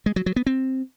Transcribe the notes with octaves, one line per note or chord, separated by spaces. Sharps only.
G#3
F#3
F#3
B3
C4